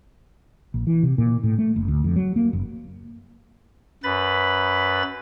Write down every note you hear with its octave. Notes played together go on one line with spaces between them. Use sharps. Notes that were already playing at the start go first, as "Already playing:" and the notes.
A#1
E3
C3
A#2
A2
A3
F#1
D2
F2
F#3
A#3
F#1
F#2 B4 B5 A6